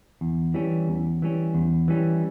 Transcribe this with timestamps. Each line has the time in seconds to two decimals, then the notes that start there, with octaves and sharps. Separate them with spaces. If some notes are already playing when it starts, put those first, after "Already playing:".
0.21 E2
0.54 E3 G3 C#4
0.88 E2
1.22 E3 G3 C#4
1.55 E2
1.88 E3 G3 C#4